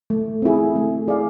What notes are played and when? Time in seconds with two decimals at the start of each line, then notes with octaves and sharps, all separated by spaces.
0.10 A3
0.42 C4 E4 G#4
0.76 A3
1.08 E4 G#4 D5 F5